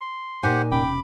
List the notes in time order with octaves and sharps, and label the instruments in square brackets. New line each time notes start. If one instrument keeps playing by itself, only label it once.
[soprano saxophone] C6
[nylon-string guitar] A#2 D#4 G#5 [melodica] G4 C5 F#5
[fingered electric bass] E1 C3 C#4 [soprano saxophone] G5 [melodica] B5 D6